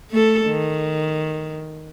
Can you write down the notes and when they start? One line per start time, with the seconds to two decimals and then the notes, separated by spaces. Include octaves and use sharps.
0.11 A3 A4
0.46 D#3